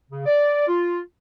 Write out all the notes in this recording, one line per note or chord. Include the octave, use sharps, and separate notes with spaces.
C#3
D5
F4